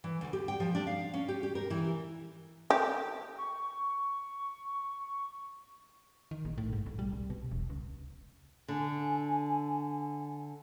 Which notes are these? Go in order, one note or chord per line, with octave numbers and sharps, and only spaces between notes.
E3
D2
G4
G5
F3
D4
F5
C#4
G4
G4
A#4
E3
G4
C#6
D#3
A#1
A2
G#2
B1
G3
C2
B2
E1
C#2
D3 G#5